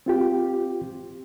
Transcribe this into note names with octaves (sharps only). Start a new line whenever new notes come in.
C4 F4 G4